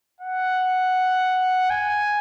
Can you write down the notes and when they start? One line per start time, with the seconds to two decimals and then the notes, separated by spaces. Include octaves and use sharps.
0.20 F#5
1.70 G#5